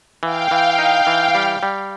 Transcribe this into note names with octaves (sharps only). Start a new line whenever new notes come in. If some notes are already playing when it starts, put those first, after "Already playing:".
E3 F5 G5
E3
D#4
E3
G3
G3